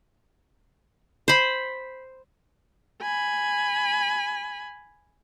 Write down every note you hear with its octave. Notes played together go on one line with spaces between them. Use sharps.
C5 B5
G#5 B5